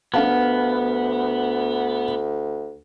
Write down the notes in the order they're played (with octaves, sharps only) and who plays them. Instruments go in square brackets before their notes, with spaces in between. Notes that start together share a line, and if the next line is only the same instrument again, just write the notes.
[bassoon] D2 [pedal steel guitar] B3 [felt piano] D4 F5 A5